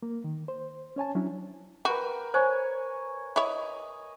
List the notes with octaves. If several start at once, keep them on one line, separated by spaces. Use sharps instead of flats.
A#3
D#3
C5
C#4 C#5 G#5 A5
F#3 C#4 D4 E4
F#4 A#4 B4 G5
C5 C#5 G#5
E4 C#5 D#5